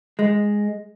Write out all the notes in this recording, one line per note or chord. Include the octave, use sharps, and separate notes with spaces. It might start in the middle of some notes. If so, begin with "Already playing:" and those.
G#3